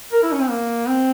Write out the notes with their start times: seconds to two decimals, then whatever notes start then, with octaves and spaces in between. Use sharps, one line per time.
0.13 A#4
0.23 E4
0.32 C#4
0.40 C4
0.50 A#3
0.88 C4